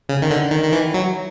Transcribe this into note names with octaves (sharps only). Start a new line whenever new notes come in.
C#3
D#3
D3
D#3
D#3
E3
F#3